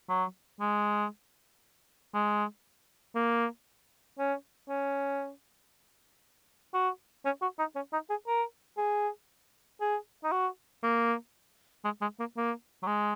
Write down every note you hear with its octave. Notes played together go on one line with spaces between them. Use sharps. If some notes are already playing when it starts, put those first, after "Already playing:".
F#3
G#3
G#3
A#3
C#4
C#4
F#4
C#4
F#4
D#4
C#4
D#4
G#4
A#4
G#4
G#4
D#4
F#4
A#3
G#3
G#3
A#3
A#3
F#3
G#3